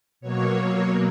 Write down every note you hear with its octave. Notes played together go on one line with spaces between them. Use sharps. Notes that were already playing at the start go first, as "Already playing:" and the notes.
B2 F#3 A#3 C#5